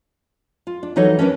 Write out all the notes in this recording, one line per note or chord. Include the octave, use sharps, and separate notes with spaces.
F4
D4
E3 F#3 D#4 F#4 A4 C#5
C#4 D4 F#4 A#4 B4